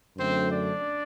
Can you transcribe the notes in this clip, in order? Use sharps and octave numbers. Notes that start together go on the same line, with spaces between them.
F#2 D3 F#3 A3 C4 C5
D4 D5